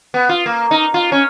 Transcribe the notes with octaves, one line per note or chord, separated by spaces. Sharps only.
B3
F4
A#3
D#4
F4
C#4